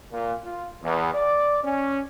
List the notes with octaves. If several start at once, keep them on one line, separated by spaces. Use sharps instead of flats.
A#2
F4
E2
D5
C#4